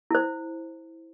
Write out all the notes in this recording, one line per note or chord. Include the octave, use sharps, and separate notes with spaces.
E4 C5